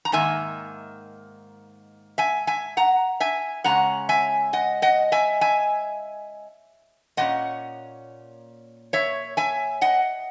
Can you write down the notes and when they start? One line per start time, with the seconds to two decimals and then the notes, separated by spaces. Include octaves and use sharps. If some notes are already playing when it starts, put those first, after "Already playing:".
0.05 A#5
0.12 G#2 D#3 A#3 E5 G#5
2.18 E5 G#5
2.47 E5 G#5
2.77 F#5 A#5
3.20 E5 G#5
3.64 C#3 G#3 C#4 F#5 A#5
4.09 E5 G#5
4.53 D#5 F#5
4.82 D#5 F#5
5.12 E5 G#5
5.41 E5 G#5
7.17 A#2 A#3 C#4 D#5 F#5
8.93 C#5 E5
9.37 E5 G#5
9.81 D#5 F#5